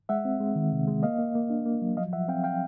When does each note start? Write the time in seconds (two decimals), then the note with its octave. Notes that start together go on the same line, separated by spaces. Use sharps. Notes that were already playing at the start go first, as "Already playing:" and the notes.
0.09 G#3 E5 F#5
0.25 C4
0.40 G#3
0.55 D#3
0.72 C3
0.87 G#3
1.03 A#3 D#5 F5
1.18 A#3
1.35 A#3
1.50 D4
1.66 A#3
1.82 F#3
1.97 F3 D#5 F5
2.13 F3 E5 F#5
2.28 C4 F5 G5
2.44 F5 G5